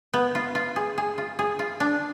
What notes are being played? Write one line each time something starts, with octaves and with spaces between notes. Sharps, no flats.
B3
F4
F4
G#4
G#4
F4
G#4
F4
D4